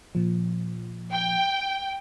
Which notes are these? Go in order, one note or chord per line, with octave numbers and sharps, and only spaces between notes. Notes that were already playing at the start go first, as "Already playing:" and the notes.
A#2 F3
G5